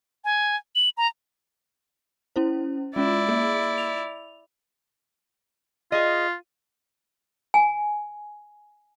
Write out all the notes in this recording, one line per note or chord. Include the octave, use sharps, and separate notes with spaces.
G#5
F#7
A#5
C#4 E4 C5
G#3 C#4 E4 F4 D5
A#3 G#4
F7
F4 G#4 D#5
G#5